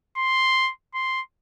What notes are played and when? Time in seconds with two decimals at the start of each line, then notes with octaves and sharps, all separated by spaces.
0.17 C6
0.94 C6